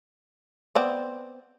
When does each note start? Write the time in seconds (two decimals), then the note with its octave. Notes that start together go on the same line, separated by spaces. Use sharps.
0.75 B3 C4 D5